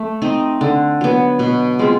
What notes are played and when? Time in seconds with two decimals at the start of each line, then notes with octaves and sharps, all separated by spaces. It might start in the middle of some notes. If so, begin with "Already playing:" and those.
Already playing: A3
0.22 C4 D#4
0.61 D3
1.01 F#3 B3
1.39 B2
1.79 G#3 C4 F4